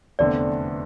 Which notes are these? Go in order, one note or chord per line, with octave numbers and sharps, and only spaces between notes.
F1 E2 D3 A3 C4 D5